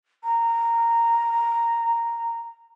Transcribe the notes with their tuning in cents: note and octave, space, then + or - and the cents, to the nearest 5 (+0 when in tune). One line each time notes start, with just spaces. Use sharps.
A#5 -10